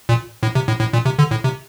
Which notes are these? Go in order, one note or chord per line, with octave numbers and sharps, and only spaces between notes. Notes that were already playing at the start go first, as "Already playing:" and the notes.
A#2
A2
C3
A2
A2
A#2
C3
D3
A2
C3